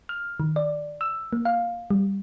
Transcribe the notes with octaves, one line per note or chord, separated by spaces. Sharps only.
F6
D#3
D5
E6
A#3
F5
G3